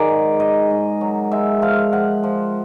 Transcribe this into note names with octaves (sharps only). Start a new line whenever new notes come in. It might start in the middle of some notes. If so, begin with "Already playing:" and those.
Already playing: D#3 F#3 G#4 A#4 D5
G#2
D#3 D#5
G#2
F#3
G#3 E5
F3 F5
F3 F#5
F3